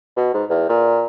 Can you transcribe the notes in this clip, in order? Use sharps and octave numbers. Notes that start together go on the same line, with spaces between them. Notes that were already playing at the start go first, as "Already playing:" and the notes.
B2
G#2
E2
A#2